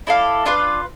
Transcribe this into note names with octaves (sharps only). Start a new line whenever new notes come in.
E4 A4 D5 F5
D4 F4 B4 F5